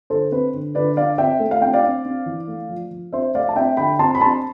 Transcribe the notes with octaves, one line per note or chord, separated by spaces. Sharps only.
D3 A4 C5
C4 B4
D3
D3 B4 D5
D3 D5 F5
C4 E5 G5
A3
F5
C4 G5
D5 F5
C4
C4
E3
A3
F3
F3
C4 C5 E5
A3 D5 F5
A5
C4 E5 G5
D3 G5 B5
C4 A5 C6
B5
C4 A5 C6